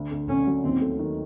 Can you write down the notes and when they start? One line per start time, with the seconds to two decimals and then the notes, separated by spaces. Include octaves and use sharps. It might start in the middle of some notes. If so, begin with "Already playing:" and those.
Already playing: D2
0.11 D2
0.29 D3 C#4
0.47 F#3
0.64 D#2 C4
0.81 A3
0.99 D#3